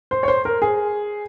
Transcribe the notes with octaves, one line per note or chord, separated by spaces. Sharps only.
C5
C#5
C5
A#4
G#4